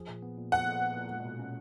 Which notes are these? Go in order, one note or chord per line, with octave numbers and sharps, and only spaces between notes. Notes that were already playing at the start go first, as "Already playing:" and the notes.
Already playing: F3 G#4
A#2
B3
A#2
F3 F#5
A#2
B3
A#2
G#3
B2
C#4